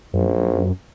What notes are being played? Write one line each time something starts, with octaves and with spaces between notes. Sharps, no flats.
A#1 F#2